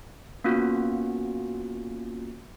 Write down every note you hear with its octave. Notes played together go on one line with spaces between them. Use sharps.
A#3 B3 C#4 F4 F#4